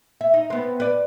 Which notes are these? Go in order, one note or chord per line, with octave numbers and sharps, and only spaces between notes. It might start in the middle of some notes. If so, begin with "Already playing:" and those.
E5
D#4
B3 C4
B4 D5